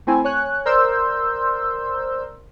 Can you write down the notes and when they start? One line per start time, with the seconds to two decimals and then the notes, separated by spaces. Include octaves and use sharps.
0.07 A3 C4 E4 G#5
0.24 C#5 G#5 F#6
0.65 A#4 C5 D5 C6 E6 G6